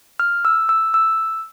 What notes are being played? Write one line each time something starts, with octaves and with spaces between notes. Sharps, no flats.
F6
E6
E6
E6